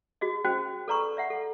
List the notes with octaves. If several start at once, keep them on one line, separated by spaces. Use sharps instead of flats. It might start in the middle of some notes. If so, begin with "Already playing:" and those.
F#4 G#4 D#5
C#4 F#4 C5 G5
A4 B4 D5 A#5 B5 C#6
D5 E5 F#5
A4